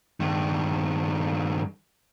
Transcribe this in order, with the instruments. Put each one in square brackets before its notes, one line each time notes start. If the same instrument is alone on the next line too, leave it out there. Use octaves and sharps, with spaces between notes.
[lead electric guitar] G2 D#3